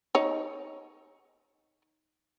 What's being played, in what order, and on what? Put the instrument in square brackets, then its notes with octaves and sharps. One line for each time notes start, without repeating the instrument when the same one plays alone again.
[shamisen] D#4 C#5